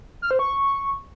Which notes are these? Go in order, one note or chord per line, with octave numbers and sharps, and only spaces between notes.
F6
C5
C#6